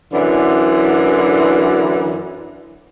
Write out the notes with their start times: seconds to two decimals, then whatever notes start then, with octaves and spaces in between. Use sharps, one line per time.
0.12 F#2 D3 E3 D4 E4